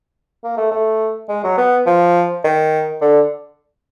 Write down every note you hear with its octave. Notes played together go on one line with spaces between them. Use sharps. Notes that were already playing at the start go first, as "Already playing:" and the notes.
A#3
A3
A3
G#3
F#3
B3
F3
D#3
D3